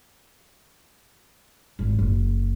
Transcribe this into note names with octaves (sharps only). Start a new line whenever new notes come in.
G#1
F#1